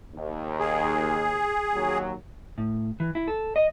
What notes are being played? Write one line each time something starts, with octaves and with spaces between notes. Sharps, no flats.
D#2
G#4
D#2 F#3
A2
E3
E4
A4
D#5